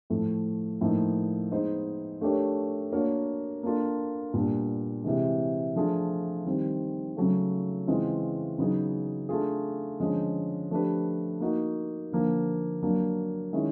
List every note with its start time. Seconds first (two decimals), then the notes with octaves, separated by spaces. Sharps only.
0.10 A2 F3 A3
0.81 A2 F3 A#3 D#4
1.51 G#3 B3 D#4 G#4 C5
2.21 A3 D4 G4 A#4 C#5
2.92 A#3 D4 F#4 A#4 C#5
3.63 A#3 D4 F4 A4
4.34 A#2 G3 B3 D4
5.04 C3 E3 G#3
5.76 F3 A3 D4 F4 G#4
6.45 D#3 G3 C4
7.16 C#3 F#3 A3
7.87 C#3 E3 G#3 C4 F4
8.58 C#3 F#3 B3 D#4 G#4
9.29 A3 D4 F4 G#4
10.00 D3 F3 G#3 C#4
10.70 F3 A3 D4 G4 B4
11.40 A#3 D#4 F#4
12.12 D3 F3 A#3
12.82 F#3 A#3 D4
13.53 D#3 G#3 C#4 E4